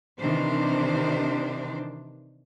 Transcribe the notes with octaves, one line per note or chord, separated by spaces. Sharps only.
C3 D#3 E3 D4 C5